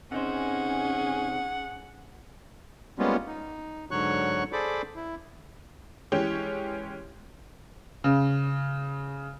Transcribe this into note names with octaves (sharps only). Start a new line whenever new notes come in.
C3 C#4 D#4 G#4 C5 F#5
G3 G#3 A#3 B3 C#4 F4
D#4
G#2 D3 F#3 C#5 C#6 F#6
G#4 A4 C5 D5 B5 D6
E4
E3 G#3 C#4 G4 C#5
C#3